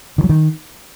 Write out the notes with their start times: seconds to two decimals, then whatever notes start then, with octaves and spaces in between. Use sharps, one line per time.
0.18 D#3
0.24 F#3
0.29 D#3